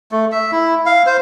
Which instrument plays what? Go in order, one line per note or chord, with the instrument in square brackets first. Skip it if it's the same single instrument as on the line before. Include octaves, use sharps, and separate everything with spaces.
[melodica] A3
E5
E4
F5
C5